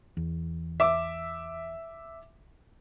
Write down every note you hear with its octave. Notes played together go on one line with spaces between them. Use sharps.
E2
E5 D6